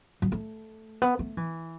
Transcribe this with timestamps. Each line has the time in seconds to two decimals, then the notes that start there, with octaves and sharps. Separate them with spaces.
0.22 F#3
0.32 A3
1.02 B3
1.19 A3
1.37 E3